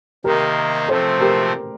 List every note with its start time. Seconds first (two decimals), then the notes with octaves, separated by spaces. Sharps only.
0.24 C3 D#3 A#3 D#4 G4 A#4
0.88 C3 F3 A3 C4 A4 C5
1.20 G4 A#4